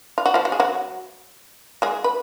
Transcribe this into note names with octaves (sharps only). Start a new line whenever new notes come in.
F4
F#4
F3 F4
F#4
G#4
F#3 F#4
G#3 G#4
B4